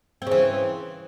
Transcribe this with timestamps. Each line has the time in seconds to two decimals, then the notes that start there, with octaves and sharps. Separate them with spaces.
0.22 C4
0.27 C#3
0.31 E3